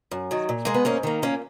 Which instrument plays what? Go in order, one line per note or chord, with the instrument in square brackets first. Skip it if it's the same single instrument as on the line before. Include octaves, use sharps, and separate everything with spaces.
[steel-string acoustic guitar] F#2
D#3 F#3
A#2
G#3 A#3
B3
G#2 A#3 C#4
D#3 A#3
A#2 A#3 C#4